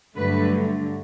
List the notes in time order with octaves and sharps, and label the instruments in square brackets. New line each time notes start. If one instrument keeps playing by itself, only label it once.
[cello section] G2 D3 F#3 A3 B4